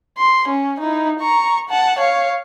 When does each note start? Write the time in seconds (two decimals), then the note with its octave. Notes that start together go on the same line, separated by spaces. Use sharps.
0.18 C6
0.48 C#4
0.80 D#4 E4
1.19 A#5 C#6
1.69 F#5 A5
1.98 C#5 F5